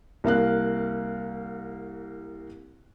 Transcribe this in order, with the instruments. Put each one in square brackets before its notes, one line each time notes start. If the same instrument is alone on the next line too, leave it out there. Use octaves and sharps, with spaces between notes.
[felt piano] C2 A#3 F5 F#6